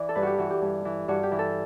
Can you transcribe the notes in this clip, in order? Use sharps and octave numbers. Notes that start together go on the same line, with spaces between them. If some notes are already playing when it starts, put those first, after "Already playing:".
Already playing: E3 D5
A4
G2 B4
F#4 G4
E3 F#4
G4
G2
E3
G2 F#4
G4
E3
A4